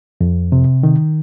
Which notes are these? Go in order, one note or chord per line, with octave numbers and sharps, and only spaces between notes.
F2
C3
D#3